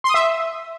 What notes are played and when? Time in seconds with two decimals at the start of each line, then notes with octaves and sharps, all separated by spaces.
0.04 C6
0.09 D#6
0.14 E5